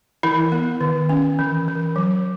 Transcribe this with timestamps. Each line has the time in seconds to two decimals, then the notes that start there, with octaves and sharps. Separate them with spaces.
0.23 E3 E4
0.52 B3
0.81 D#3
1.09 C#4
1.39 E3
1.68 E3
1.96 F#3